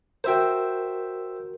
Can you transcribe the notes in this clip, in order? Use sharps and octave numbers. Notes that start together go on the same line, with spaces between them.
F#4 A#4 C5 E5 G5